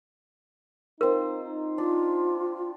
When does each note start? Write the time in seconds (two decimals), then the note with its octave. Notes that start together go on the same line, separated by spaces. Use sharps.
1.01 C4 D#4 F4 A#4
1.78 D4 F4